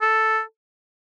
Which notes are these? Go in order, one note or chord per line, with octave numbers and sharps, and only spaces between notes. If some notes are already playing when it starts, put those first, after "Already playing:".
A4